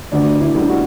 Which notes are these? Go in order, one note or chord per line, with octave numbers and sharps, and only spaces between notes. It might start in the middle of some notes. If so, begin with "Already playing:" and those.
D2 D4
E4
D3 G3
F#4